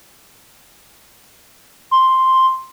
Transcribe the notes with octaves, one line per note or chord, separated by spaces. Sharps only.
C6